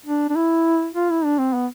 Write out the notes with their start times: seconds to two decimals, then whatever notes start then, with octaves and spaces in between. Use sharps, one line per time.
0.06 D4
0.30 D4
0.36 E4
0.95 F4
1.10 E4
1.25 D4
1.38 C4
1.54 B3